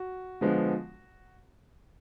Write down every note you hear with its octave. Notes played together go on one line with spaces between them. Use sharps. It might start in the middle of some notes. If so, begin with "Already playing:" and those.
Already playing: F#4
D3 F3 G#3 B3